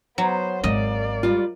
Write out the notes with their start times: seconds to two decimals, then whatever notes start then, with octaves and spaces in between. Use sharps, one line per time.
0.18 F#3 B3 C5
0.64 G#1 G#3 A#3 D5 D#5
1.23 G3 F4